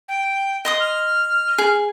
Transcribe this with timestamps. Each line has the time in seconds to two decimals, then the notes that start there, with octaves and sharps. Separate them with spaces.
0.08 G5
0.65 D#5 C6 D#6
0.80 F6
1.58 G#4